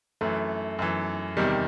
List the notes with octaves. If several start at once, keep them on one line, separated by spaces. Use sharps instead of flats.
F#2 E3 A3
F#2 E3
E2 C3 D#3 G3